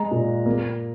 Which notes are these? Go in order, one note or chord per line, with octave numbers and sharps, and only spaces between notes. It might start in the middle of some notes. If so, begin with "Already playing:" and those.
Already playing: G#3 A#5
A#2
A#3